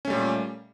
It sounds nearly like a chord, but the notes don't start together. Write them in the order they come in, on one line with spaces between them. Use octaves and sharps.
C#4 A3 G3 A#2